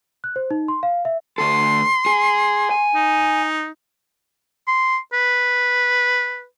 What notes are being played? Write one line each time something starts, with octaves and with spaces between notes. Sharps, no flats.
F#6
C5
D#4
C6
F5
E5
D2 A4 C6
G#4
G#5
D#4
C6
B4